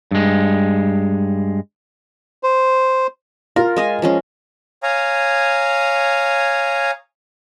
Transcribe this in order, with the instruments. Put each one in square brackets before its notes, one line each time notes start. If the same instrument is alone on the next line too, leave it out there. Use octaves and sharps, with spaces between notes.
[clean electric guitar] G2 G#3
[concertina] C5
[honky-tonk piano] F4 [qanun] A#4
[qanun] G#3 D#5 G#5
F3 G#3 C#4
[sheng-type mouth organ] C#5 F5 G#5 A#5 D#6